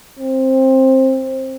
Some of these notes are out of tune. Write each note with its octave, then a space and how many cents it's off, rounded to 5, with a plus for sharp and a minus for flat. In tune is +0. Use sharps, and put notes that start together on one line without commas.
C4 +15